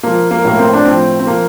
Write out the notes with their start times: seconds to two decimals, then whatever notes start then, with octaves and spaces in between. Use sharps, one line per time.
0.03 F3 A#3
0.31 A#3
0.45 A2 A#3
0.59 C4
0.73 D4
0.85 F3 C4
1.20 C4
1.27 F3 A#3